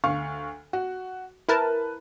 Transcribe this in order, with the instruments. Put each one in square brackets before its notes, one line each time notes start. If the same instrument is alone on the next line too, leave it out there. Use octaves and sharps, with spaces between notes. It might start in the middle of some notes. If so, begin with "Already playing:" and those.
[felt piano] D2 F5 C#6
F#4
[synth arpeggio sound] E4 A#4 A5 [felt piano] B4